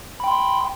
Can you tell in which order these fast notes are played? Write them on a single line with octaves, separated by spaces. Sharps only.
B5 G5 C6